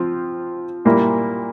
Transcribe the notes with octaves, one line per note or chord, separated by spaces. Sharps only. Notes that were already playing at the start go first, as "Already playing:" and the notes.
Already playing: F3 C4 F4
A#2 G3 A#3 E4